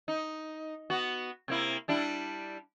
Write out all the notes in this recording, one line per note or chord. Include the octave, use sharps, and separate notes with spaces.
D#4
B3 F#4
C3 A#3 E4
G3 D4 E4